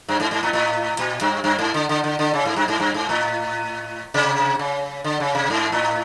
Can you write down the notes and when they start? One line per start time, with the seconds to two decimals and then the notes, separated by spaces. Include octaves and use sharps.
0.08 G2
0.20 G#2
0.31 G#2
0.43 A2
0.53 A2
0.99 A#2
1.21 G2
1.44 G2
1.59 G#2
1.74 D3
1.89 D3
2.04 D3
2.19 D3
2.34 C#3
2.45 G#2
2.56 G2
2.68 G#2
2.80 G2
2.94 G#2
3.09 A2
4.14 C3
4.59 C#3
5.04 D3
5.20 C#3
5.35 C3
5.50 G#2
5.72 A2